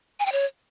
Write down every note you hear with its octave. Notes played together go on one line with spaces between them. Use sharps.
G#5
G5
C#5